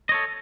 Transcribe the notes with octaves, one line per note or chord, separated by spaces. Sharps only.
A4 C#5 D#5